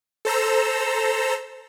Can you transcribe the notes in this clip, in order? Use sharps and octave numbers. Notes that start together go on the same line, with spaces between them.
A4 C5 A#5 E6